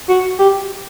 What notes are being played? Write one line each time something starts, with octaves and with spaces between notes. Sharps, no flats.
F#4
G4